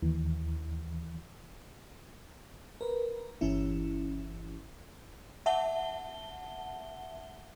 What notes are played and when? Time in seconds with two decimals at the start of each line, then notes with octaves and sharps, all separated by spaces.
0.02 D#2 E3
2.81 A#4 B4
3.41 G1 E3 C#4 E4
5.46 E5 F#5 A5 G7